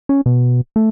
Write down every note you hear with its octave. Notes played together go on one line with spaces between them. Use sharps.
C#4
B2
A3